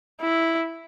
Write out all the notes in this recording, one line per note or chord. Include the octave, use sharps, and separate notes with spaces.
E4